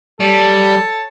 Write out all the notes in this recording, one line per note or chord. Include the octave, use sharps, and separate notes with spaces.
G3 A4 C#5 A5